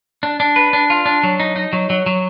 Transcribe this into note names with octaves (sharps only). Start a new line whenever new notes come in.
D4
D4
B4
D4
F4
D4
F#3
D#4
D#4
F#3
F#3
F#3